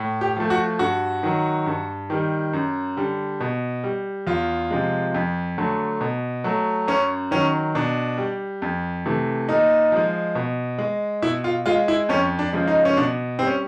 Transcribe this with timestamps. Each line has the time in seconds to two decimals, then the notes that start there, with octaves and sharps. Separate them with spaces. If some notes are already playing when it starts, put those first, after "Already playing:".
Already playing: A2
0.21 G4
0.37 F3 A3
0.50 F#4
0.79 G2 F#4
1.23 D#3 F#3
1.66 G2
2.10 D#3 G3
2.53 F#2
2.97 D3 G3
3.40 B2
3.84 G3
4.27 E2 F4
4.71 C3 F3 G#3
5.14 F2
5.58 D3 F#3 A3
6.01 B2
6.44 F#3 A3
6.87 F#2 C#4
7.31 D#3 F#3 C#4
7.75 B2 D4
8.18 G3
8.62 F2
9.06 C3 E3 A3
9.49 A#2 D#4
9.92 F3 G#3
10.35 B2
10.78 G#3
11.22 B2 E4
11.44 F4
11.66 G#3 F4
11.88 E4
12.09 F2 C#4
12.39 D4
12.53 C#3 F3 G#3
12.68 D#4
12.85 C#4
12.97 B2 D4
13.39 G3 C4
13.47 C#4